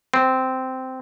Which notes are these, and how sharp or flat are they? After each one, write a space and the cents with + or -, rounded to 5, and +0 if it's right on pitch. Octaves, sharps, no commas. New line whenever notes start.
C4 -10